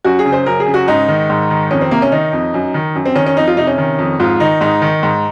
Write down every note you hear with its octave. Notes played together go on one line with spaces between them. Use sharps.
F#2 F#4
G#4
C#3
C5
F#2 A#4
G#4
C#3
F#4
G#2 D#4
D#3
G#2
D#3
F2 C#4
C4
C3 A#3
C#4
D#3 D#4
F2
F#2
D#3
F#2
C4
D#3 C#4
C#4
F2 D#4
F4
C3 D#4
C#4
D#3
F2
G#2 F4
D#3 D#4
G#2 D#4
D#3
G#2